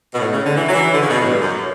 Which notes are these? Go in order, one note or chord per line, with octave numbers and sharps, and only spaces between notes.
B2
A2
C#3
D3
E3
F#3
E3
D3
C#3
B2
A2
G2
F#2